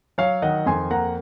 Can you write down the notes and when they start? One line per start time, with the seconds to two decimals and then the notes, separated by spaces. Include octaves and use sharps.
0.18 F#3 C#5 F5
0.42 D#3 D#5 F#5
0.66 F2 G#5 C6
0.91 A#3 F#5 A#5